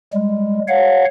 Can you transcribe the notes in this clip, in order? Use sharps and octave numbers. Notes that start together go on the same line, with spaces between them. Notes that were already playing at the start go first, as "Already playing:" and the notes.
G3 G#3
C#5 F5 F#5